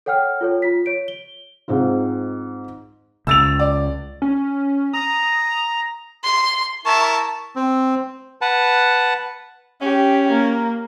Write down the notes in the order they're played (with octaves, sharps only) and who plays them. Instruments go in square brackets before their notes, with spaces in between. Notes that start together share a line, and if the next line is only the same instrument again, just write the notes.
[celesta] A4 C#5 F#5 G5 F6
F4 A4 C#5
F4 B6
C#5 D7
G7
[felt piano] G#2 C4 D#4 F4
[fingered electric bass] C#2 [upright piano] E6 A6 F7
[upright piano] D5
[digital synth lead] C#4
[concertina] A#5 [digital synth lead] D#6
[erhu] C6
[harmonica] E4 A#4 C#6 [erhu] A5
[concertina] C4
B4 F#5 A5
[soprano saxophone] C#4 [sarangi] G4
[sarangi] A#3